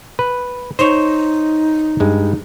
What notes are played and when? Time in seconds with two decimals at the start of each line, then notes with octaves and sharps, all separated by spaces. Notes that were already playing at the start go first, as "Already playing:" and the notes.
0.19 B4
0.79 D#4 C5 C#5
2.00 G2 G#3